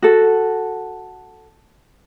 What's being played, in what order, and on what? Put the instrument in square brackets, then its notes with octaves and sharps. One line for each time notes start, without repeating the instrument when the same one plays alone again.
[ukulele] F#4 A4